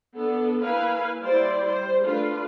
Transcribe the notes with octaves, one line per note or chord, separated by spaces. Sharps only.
B3 D4 A4
A#3 E4 B4 F5 G#5
G3 E4 C5 D5
G3 C5
A3 D4 F4 A4 B4